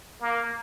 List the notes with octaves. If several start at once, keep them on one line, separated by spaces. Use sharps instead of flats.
A#3